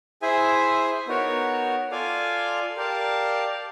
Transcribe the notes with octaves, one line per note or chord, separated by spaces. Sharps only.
E4 G#4 C5 E5 G#5
B3 D#4 F#4 A#4 C#5
F4 A4 D5 F5 G#5
G4 A#4 D5 F5 A5